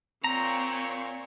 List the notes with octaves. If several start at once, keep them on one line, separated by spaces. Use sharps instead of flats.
A#2 C4 C#5 A#5